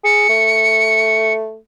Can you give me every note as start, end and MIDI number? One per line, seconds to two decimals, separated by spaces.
0.04 0.26 68
0.04 1.32 97
0.29 1.57 57